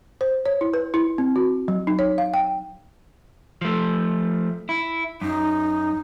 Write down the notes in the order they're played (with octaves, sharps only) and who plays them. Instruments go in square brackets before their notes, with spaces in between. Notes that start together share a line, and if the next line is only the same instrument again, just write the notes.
[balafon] C5
C#5
E4
B4
E4
C4
F#4
F#3
D#4
C#5
F5
G5
[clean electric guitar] F3 A3
E4
[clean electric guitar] F#2 [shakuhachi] D#4